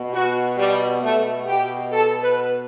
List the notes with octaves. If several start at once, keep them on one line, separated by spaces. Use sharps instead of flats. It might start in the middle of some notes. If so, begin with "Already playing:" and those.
Already playing: B2
F#4
G3
B2 A3
G4
A4
B4